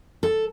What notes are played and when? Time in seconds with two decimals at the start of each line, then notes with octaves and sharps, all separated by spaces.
0.23 A4